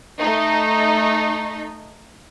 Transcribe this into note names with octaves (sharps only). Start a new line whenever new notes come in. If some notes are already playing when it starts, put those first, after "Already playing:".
A3 D#4